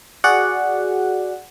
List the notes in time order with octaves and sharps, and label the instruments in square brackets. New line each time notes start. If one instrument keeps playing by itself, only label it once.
[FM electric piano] F#4 G#4 D5 F#5